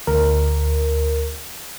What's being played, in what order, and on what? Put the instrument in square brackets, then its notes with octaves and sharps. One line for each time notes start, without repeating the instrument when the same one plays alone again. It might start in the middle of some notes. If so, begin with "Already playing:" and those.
[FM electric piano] D2 A#4